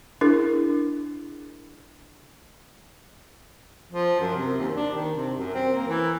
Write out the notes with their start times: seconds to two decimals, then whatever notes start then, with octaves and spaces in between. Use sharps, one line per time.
0.21 D4 E4 G#4 A#4
3.92 F3
4.20 F#2
4.35 C3
4.59 D#2
4.75 D4
4.94 D#3
5.15 C3
5.38 F#2
5.54 C4
5.75 A#3
5.88 E3